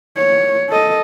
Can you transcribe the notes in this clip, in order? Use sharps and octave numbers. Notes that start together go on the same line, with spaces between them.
C#5
A4 D#5